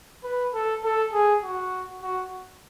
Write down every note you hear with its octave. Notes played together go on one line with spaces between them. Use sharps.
B4
A4
A4
G#4
F#4
F#4